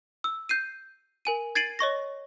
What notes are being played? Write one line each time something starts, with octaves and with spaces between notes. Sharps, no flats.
E6
G6 C7 D#7
A#4 G#5 D#7
G#6 A6 C7 D7 D#7 F#7
C#5 D#5 C#6 A#6